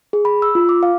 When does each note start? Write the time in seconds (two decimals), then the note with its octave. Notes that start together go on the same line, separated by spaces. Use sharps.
0.13 G#4
0.25 B5
0.42 E6
0.55 F4
0.69 D6
0.83 F5